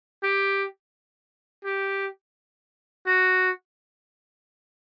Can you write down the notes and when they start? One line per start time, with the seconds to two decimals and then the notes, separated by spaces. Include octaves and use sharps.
0.23 G4
1.65 G4
3.07 F#4